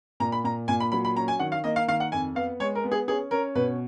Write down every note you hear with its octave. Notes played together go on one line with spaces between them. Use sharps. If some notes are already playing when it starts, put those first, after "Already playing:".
A#2 A#5
B5
A#2 A#5
A#2 G#5
B5
F#3 B5
B5
C#4 A#5
G#5
D#3 F#5
F5
A#3 D#5
F5
D#3 F5
F#5
F2 G#5
B3 F5
G#3 C#5
A#4
B3
G#4
C#4 G#4
C#4 A#4
B2 B4